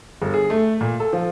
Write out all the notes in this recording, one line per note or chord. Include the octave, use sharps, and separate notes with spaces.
G1
G#4
A3
A#2
A4
F3